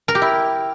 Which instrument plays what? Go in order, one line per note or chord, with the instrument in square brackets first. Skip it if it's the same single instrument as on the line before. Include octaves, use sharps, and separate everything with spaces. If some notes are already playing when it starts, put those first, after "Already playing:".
[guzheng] A#4
G4
E4